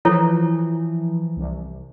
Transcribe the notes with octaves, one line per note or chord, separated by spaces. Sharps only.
E3 F3 E4 A4 C#5
C2